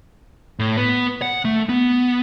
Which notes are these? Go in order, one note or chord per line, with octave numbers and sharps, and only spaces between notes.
A2
B3
F#5
A3
B3